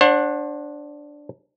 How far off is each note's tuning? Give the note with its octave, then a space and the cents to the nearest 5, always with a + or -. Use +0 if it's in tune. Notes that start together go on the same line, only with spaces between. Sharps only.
D4 +0 C5 +40 F#5 -10